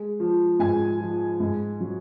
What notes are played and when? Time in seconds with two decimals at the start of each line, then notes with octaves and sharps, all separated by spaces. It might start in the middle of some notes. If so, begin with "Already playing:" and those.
Already playing: G#3
0.20 F3
0.59 G#2 G#5
1.00 F3
1.40 G#2
1.81 F#3